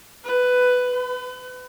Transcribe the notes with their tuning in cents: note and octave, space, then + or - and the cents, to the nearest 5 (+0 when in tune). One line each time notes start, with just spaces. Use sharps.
B4 +10
B4 +35